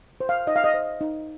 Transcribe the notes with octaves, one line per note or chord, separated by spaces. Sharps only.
C5
F5
D#4 D#5
F5
D#5
C5
D#4